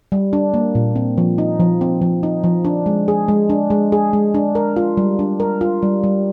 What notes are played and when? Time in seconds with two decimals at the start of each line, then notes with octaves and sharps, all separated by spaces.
0.12 G3
0.33 D4
0.54 A#3
0.75 A#2
0.96 C4
1.18 F3
1.38 D#4
1.60 F3
1.81 C4
2.02 F3
2.23 D#4
2.44 F3
2.65 D4
2.86 G#3
3.08 G#4
3.28 G#3
3.50 D4
3.70 G#3
3.92 G#4
4.13 G#3
4.34 D4
4.55 A#4
4.76 F4
4.97 G3
5.19 D4
5.40 A#4
5.61 F4
5.82 G3
6.04 G3